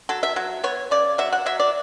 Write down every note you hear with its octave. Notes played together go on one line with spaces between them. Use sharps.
F#3 A4
E5
F#3
B3 C#5
C#3 D5
F#3 E5
F#5
F#3 E5
D5